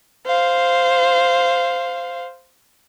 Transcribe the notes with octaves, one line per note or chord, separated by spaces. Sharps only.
C5 F5